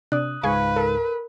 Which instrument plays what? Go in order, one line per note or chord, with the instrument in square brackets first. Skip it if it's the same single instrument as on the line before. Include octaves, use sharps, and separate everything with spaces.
[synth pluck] C3 D4 D5 [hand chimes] D#6 F#6
[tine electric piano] C#2 G#2 [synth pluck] G#4 G#5 C#6 [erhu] B4 [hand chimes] F5
[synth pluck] A4 [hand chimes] A#4